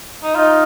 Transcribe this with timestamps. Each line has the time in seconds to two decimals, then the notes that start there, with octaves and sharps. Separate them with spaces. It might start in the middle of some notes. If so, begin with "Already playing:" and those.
0.23 D#4
0.35 D#4 F4